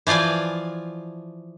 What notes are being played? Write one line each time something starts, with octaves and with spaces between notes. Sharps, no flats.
E3 F3 F4 D5 G#5